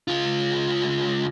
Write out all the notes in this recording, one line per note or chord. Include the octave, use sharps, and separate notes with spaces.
C#2 F4